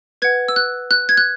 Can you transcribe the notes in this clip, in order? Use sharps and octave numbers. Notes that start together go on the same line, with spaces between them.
B4 F#5 G#6
E6
F#6
F#6
G#6
F#6